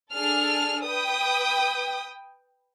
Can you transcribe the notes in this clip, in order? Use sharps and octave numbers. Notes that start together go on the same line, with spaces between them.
D4 G#4 A4 F6
B4 G5 D#6